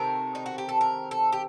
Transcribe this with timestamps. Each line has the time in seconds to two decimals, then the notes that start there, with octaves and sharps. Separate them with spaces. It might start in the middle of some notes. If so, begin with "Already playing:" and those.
Already playing: C3 D#3 A3 C4 A#4
0.35 D#4
0.46 F#4
0.58 G4
0.69 A4
0.81 A#4
1.11 A4
1.32 G4